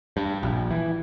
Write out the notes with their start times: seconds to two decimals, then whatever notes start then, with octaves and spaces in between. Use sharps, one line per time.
0.17 G2
0.43 A#1
0.71 E3